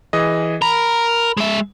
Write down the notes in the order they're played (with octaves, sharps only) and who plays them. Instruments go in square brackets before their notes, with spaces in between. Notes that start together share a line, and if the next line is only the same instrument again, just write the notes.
[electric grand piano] E3 G#4 D#5
[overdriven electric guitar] A#4 [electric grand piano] B5
[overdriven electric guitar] G#3 E5